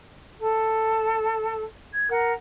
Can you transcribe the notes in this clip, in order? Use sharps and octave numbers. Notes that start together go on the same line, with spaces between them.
A4
G#6
A#4 F#5